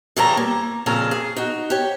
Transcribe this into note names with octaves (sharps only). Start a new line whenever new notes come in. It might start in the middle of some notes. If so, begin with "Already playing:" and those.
C#3 E3 G3 A4 C#5 A#5
A#3
F2 A#2 C#3 A4 F5 A#5
G#4
D#4 F#4
G4 C#5